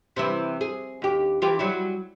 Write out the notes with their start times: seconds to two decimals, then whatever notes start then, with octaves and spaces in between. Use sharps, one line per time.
0.16 C3 E3 E4
0.61 G#4
1.02 D#2 G4
1.42 E3 F4 G4
1.59 F#3 G3 E4